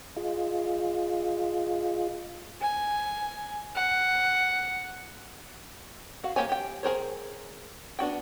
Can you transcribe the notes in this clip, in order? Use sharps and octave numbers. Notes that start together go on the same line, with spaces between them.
F4 G#4 D#5 F5
G#5
F#5
F#4 F5
A#3 C4 G4 C#5 G#5
G4 G5
G#4 A#4 C5 C#5
B3 D4 F#4 G5